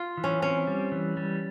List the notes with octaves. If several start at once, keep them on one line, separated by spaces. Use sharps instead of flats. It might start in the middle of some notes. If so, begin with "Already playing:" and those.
Already playing: F4
E3
C#4
C4 C#4
G3
E3
G3